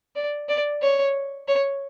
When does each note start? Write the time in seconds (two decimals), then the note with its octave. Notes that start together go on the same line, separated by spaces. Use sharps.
0.16 D5
0.49 D5
0.82 C#5
1.48 C#5